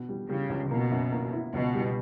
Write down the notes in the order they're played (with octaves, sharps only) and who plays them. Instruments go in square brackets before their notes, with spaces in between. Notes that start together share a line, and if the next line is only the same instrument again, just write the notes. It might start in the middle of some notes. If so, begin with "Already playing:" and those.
Already playing: [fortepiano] B2
G3
[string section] C#3 [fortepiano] G3
[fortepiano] C#2
[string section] B2 [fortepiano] A#3
[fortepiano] F#2
A#3
E4
[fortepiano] C#2 [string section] B2
[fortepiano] G3